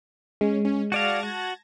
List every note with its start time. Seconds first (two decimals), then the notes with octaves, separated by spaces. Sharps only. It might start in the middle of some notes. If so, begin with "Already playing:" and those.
0.41 G#3 C#4
0.65 C#4
0.92 F#4 D5 F5 A5 G#6 A#6
1.23 F#4